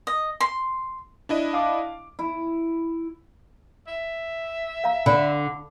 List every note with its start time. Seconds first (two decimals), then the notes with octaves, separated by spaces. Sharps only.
0.07 D#5
0.41 C6
1.29 D4 E4 D#5
1.53 F5 A5 D6
2.19 E4
3.87 E5
4.84 F5 A#5
5.06 D3 B5